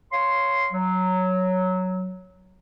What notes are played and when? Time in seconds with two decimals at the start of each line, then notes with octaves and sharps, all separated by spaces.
0.11 C#5 F5 C6
0.72 F#3